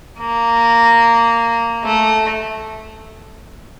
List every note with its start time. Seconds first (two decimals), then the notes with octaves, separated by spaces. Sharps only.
0.19 A#3
1.84 A3